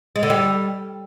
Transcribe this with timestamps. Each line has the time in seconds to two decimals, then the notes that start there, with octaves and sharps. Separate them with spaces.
0.16 G#3
0.23 D3
0.30 G3